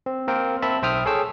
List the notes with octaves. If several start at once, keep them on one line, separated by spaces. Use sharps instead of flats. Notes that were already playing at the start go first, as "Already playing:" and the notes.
C4
A#3 C4 A#4 G5
C4 E5 A5 B5
B1 C5 E5 G5 D#6 F6
G#4 A4 C#5 G5 E6